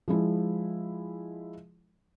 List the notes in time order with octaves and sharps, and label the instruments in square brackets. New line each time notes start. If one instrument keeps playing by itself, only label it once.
[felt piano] F3 G#3 E4